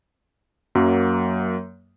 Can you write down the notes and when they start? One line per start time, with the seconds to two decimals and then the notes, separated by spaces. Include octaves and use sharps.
0.75 F#2 F#3 A#3